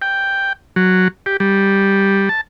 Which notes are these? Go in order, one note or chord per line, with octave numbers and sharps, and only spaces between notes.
G5
F#3
G4
G3
A5